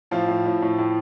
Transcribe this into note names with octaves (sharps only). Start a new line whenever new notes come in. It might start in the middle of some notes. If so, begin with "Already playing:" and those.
A2 F3 F4
A2
A2
A2
A2